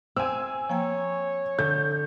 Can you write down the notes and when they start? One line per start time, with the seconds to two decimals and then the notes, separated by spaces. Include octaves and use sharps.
0.16 C4 G#5 E6
0.70 F3 A#3 C#5 G5
1.59 D3 G6